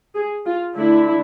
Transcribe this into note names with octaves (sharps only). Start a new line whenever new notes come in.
G#4
F4
D3 A3 D4 E4